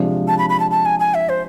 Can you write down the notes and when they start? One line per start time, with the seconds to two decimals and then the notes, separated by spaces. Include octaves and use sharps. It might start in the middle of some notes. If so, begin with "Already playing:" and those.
Already playing: C3 F3 G#3 D4
0.28 A5
0.39 B5
0.50 B5
0.60 A5
0.71 A5
0.86 G#5
1.00 G#5
1.14 E5
1.29 C5